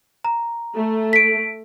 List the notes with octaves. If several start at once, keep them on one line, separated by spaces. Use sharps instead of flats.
A#5
A3
B6 D7